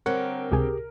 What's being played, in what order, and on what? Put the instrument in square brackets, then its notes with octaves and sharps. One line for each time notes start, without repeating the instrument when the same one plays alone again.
[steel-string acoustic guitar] D3 G3 C4 [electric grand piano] A#4 [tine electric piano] C#5 F#5
[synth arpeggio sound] C#2 C3 G#5 [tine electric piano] G4 G#4